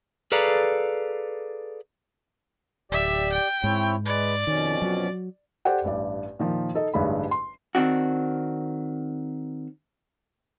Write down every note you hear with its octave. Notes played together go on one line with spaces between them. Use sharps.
G#4 A4 B4 D5 F5 A#5
D1 G4 D5 E5
G5
G#2 C4 E4 C#5
G#3 B4 D5
F2 B2 D#3 C#4
F#3
G4 A4 C5 D5 F#5 G5
A1 G2 D5
A#2 D#3 F3
D#4 A4 D#5
A1 G2 D3 G#3 D#4 B5
C6
D#3 C4 D4 F#4